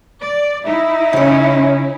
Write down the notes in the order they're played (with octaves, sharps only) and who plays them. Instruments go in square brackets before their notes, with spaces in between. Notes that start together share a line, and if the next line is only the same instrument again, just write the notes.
[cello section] D5
[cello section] D#4 E4 [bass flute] E5
[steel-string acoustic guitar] C#3 C#5 [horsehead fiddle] C#4